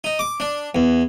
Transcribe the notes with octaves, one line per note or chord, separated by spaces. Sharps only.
D#4
D6
D4
E2